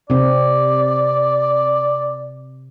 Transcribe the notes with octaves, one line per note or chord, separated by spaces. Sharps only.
C3 C4 D5